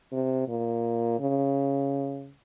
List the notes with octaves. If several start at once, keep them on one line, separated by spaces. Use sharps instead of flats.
C3
A#2
C#3